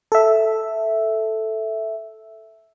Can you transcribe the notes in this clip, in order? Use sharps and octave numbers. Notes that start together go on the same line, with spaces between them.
A4 E5